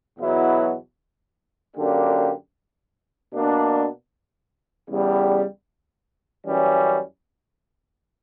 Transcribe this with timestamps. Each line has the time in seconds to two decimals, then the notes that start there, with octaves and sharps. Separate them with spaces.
0.20 E2 B2 F#3 B3 E4
1.76 F#2 D3 A#3 D4 G4
3.33 B2 A#3 D4
4.89 E2 C#3 G3
6.46 F#2 E3 G3 C#4